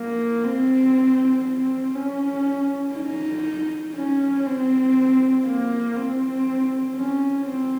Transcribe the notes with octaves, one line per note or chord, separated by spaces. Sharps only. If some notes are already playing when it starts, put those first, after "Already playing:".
Already playing: A#3
C4
C4
C#4
D#4
C#4
C4
A#3
C4
C#4
C4